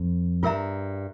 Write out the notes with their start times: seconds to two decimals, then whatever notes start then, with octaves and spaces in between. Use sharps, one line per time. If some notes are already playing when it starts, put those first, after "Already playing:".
Already playing: F2
0.43 G2 F4 A#4 E5 A#5